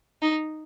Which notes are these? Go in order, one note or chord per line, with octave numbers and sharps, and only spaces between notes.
D#4